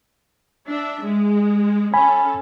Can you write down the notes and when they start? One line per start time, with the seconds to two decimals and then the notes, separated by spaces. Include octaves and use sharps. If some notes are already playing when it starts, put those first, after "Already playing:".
0.68 D4 E5
1.04 G#3
1.94 C#4 A4 G#5 B5